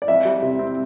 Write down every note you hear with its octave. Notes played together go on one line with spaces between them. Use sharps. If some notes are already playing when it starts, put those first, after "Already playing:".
D5
F2 E5
G3
C3
C4